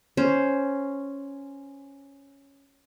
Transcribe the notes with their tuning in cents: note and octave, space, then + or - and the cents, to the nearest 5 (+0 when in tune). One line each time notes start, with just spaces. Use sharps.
C#4 +0 C5 +0